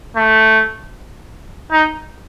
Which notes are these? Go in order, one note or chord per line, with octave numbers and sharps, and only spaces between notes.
A3
D#4